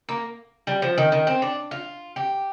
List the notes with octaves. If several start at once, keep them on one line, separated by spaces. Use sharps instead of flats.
A#3
G3
F3
D#3
D#3
C4
D4
F4
G4